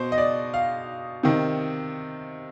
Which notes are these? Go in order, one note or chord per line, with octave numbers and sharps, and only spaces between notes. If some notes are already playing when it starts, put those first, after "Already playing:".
Already playing: B2 C5
D#5
D5
F5
C3 D#3